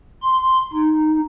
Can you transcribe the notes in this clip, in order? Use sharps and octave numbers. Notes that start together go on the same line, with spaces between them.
C6
D#4